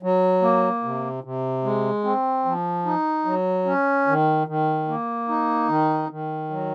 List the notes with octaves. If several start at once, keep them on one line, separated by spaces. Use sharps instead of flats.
F#3
A#3
C3
C3
G#3
C4
F3
D#4
F#3
C#4
D#3
D#3
A#3
D#4
D#3
D#3
F#3